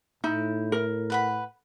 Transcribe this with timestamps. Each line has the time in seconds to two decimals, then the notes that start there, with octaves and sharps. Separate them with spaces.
0.24 A2 D#4 E4
0.72 A#4
1.10 B4 F#5 B5